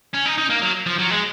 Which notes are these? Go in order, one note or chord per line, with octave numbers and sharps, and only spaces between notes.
C#4
D#4
D#4
A#3
F#3
F3
F#3
G#3